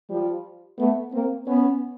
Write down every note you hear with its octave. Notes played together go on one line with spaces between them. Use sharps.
F3 G3
A3 B3
A#3 C4
B3 C#4